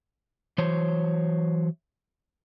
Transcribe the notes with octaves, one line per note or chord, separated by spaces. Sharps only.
E3 F#3 C5 C#5